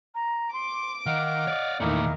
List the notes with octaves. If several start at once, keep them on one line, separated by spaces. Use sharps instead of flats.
A#5
C6 D6
D#3 D#5 F5 F#5 F6
C#5 D5
E2 A#2 D#3 A3 D#4 E4 F5 D6